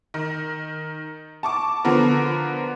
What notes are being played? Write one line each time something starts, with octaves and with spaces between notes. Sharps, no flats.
D#3
A5 C#6 D6
D3 F3 B3 A#4 B4